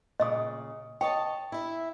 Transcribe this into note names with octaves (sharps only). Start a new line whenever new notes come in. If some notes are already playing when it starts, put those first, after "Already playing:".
A#2 C#3 D#5 D#6
C#5 D#5 G5 A5
E4 E5